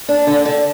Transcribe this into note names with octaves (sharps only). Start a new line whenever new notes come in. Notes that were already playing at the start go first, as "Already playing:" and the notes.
D4
D3
D3